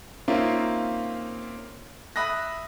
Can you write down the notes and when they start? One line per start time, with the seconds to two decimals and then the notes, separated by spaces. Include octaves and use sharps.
0.28 A#3 C4 C#4 D#4 F4 E5
2.16 E5 B5 D#6 F#6 A#6